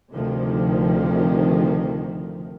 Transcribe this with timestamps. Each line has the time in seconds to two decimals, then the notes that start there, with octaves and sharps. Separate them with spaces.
0.12 D2 C3 D#3 F3